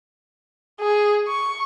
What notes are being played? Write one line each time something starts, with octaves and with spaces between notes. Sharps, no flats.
G#4
C#6